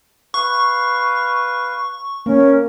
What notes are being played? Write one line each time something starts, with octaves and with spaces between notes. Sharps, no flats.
B4 F5 C#6
A#3 C#4 A#4